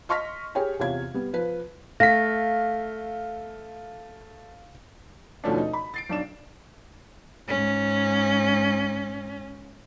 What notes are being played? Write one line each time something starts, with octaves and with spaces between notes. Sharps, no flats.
D#5 C6 C#6 F6 A#6 B6
G4 G#4 C#5 G5 G#5
E2 C3 F4 C#5 F5 G#6
G3 B3
F3 B4
A3 F5 A#6 B6
D#2 B2 F3 A3 C#4 D4
D#4
B5
A6 C7 D7
B1 D4 E7
G#2 C#4